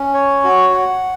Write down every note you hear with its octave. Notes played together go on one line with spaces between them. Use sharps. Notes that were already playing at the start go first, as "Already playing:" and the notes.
Already playing: C#4
C#5
F#4
F#5